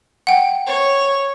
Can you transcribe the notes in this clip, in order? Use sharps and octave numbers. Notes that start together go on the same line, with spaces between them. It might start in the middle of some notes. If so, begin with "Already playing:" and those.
F#5 G5
C#5